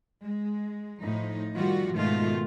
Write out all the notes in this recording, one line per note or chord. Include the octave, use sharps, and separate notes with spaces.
G#3
A2 F3 D#4
D#3 F3 G3 F4 F#4
G#2 B2 D#3 A3 F4